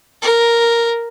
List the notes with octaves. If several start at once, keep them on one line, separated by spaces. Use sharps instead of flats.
A#4